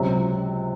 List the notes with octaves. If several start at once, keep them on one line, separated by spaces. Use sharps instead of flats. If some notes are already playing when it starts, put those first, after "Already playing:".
Already playing: C#2 C3 F#3